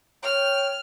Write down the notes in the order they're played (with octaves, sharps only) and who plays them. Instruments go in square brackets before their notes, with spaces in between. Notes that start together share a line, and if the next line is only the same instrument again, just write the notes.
[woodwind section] C#5 G5 [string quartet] F6